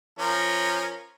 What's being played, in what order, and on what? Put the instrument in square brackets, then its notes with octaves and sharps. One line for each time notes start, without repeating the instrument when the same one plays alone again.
[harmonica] F3 C#4 A#4